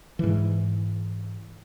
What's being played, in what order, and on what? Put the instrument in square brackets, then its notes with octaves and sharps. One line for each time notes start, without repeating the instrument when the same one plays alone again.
[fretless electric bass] G#2 E3